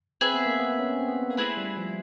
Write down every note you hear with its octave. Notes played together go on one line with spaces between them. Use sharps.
C4 G#4 B4 E5
B3
A#3
B3
C#4
C4
B3
B3
A#3
A3 C4 E4 G#4 B4
G3
F3